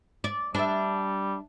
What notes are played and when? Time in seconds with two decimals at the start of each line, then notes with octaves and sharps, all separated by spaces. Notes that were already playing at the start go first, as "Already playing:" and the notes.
0.24 D5
0.55 G3 D4 E5